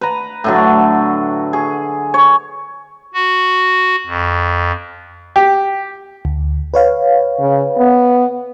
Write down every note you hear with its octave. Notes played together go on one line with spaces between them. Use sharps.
B4 A#5
A2 D3 F#3
G#4
C#5
F#4
F2
G4
D2
B4 C#5 F5
C#3
B3